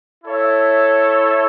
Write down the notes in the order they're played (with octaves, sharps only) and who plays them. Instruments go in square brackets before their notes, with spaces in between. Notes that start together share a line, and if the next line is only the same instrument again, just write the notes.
[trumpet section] E4 A4 C#5 E5